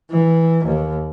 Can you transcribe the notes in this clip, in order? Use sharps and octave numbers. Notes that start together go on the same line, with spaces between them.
E3
D#2